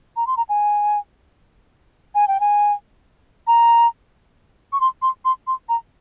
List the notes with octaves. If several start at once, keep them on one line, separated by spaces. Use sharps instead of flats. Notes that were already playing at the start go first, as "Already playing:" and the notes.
A#5
C6
A#5
G#5
G#5
G5
G#5
A#5
C#6
C6
C6
C6
C6
A#5